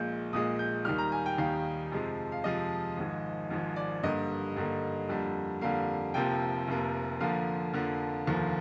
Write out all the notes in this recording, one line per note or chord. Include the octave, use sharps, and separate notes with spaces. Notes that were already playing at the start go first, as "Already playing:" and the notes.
Already playing: A#1 A#2 G#3 G6
A#1 A#2 G#3 D#6
G6
D#2 D#3 G3 F6
A#5
G#5
G5
D#2 D#3 G3 F5
F2 C3 F3 G#3
F5
F2 C3 F3 G#3 D#5
G#1 G#2 F3
G#1 G#2 F3
D5
G2 D3 G3 A#3 D#5
G2 D3 G3 A#3
F2 D3 G3 A#3
F2 D3 G3 A#3 F5
F1 F2 C3 F3 A#3 G5
F1 F2 C3 F3 A#3
F2 D3 F3 A#3 F5
F2 D3 F3 A#3
F1 D#2 D3 F3 A#3